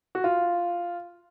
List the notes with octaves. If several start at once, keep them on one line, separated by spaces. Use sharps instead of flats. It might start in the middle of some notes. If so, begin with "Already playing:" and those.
F#4
F4